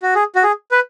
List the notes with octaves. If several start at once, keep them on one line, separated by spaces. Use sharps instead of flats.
F#4
G#4
F#4
G#4
B4